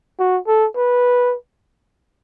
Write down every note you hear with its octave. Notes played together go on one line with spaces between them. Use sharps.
F#4
A4
B4